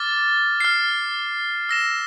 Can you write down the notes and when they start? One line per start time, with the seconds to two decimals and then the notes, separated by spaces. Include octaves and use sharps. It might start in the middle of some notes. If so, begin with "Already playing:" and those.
Already playing: D6 F6 A6
0.60 F6 A6 C7
1.69 E6 A#6 E7